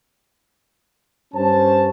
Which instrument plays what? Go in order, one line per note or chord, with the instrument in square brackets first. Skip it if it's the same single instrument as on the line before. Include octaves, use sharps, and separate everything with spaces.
[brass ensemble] G2 C#4 C5 A5